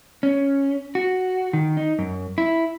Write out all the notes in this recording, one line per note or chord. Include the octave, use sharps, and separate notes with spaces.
C#4
F#4
D#3
D#4
F#2
E4